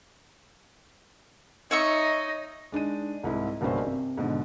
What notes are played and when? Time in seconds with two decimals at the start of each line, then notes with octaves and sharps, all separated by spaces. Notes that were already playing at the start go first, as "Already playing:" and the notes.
1.71 D#4 C#5 D#5 E5 C#6
2.72 G#3 D4 D#4 D#7
3.24 C2 G#2 E4
3.61 F#1 B1 G2 C#4 C5
3.86 C3
4.18 G#2 B2 D3